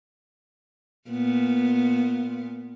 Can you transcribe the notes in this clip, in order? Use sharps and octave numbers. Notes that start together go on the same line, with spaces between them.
A#2 B3